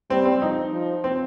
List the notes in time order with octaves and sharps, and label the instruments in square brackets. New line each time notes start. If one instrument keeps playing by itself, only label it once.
[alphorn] G3 [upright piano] C4
[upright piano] C4
[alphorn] F3 [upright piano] D#4
[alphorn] F3
[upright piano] C4